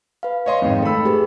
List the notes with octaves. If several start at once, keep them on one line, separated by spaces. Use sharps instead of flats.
B4 F5
C#5 D#5 C6
F2 G#2 D#3
A3 A4 B5 E6
G4 G#4 B4